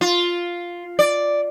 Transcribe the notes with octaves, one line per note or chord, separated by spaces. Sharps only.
F4
D5